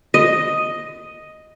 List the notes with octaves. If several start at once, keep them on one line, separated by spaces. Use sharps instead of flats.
D#5